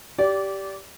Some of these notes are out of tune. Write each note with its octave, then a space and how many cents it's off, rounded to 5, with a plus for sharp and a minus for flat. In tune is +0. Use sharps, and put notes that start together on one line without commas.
G4 -10 D5 -20